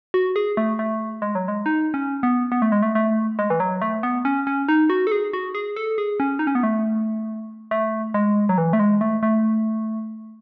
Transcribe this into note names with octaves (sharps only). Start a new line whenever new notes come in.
F#4
G#4
A3
A3
G#3
F#3
G#3
D#4
C#4
B3
B3
A3
G#3
A3
A3
G#3
E3
F#3
A3
B3
C#4
C#4
D#4
F#4
A4
G#4
F#4
G#4
A4
G#4
C#4
D#4
C#4
B3
A3
A3
G#3
F#3
E3
A3
G#3
A3
A3